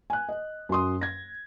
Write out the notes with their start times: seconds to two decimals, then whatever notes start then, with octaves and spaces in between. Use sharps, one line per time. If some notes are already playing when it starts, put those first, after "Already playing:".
0.10 G#5 F#6
0.29 D#5
0.69 F#2 F#3 C6 D#6
1.01 G#6 A#6